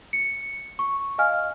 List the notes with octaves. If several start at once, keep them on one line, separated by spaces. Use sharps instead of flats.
C#7
C#6
D#5 F5 G#5 F6